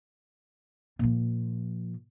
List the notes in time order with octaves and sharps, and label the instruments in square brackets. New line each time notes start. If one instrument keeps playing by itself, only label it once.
[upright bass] A#2 F3